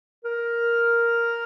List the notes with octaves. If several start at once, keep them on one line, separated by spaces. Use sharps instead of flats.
A#4